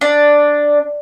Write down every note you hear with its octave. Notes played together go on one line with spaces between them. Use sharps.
D4